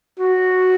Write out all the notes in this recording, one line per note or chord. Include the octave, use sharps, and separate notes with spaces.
F#4